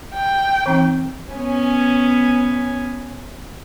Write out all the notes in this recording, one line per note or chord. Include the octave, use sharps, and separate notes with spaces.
G5
E3 C4 D#4
B3 C#4 G#5